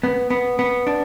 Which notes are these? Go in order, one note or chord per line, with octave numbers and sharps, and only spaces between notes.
B3
B3
B3
D4